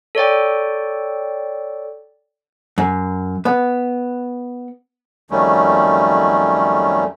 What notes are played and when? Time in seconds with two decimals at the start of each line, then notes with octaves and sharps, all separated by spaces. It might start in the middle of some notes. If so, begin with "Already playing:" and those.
0.15 A4 C#5 D5 G5
2.78 F#2
3.45 B3
5.31 F2 D#3 F#3 G3 A3 C#4